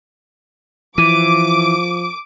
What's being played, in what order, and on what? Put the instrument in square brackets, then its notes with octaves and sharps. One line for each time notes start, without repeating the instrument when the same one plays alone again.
[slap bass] E3 [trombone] F3 [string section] D6 [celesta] D#7